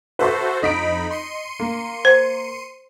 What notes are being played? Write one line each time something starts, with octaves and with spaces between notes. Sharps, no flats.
F#4 A4 B4 C5 E5 C6
F2 D#4 D#5 B5 B6 D7
C6 C#7 D#7
A#3
C5